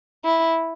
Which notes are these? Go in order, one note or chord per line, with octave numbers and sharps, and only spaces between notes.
E4